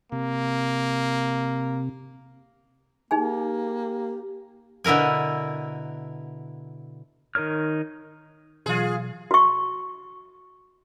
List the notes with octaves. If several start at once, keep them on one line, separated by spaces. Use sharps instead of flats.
C3 A#3
A#3 D#4 G4 G#4 G#5
B2 D3 E4 A#4 G#5
D#3 D#4 A#4 C#5 F6
B2 E3 F#3 F4 G#4
F#4 C#6